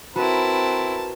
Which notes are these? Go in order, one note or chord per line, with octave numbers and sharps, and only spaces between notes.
C4 E4 F#4 A#4 B4 A5